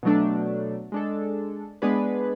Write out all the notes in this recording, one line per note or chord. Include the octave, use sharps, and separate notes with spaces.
B2 F#3 A3 D4
G#3 D4 A4
G#3 B3 D4 G#4 B4